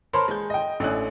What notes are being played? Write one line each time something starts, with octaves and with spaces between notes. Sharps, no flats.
A#4 C5 C#5 A5 B5 C6
G#3 G6
D#5 G5
A1 A3 C#4 D4 F#6